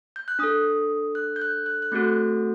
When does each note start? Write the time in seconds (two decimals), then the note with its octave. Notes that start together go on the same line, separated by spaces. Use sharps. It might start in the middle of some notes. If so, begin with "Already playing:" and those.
0.16 G6
0.28 F#6
0.39 D4 A4 D#6
1.15 F#6
1.36 G6
1.42 F#6
1.66 F#6
1.82 F#6
1.92 A3 C4 F#4 A4 G6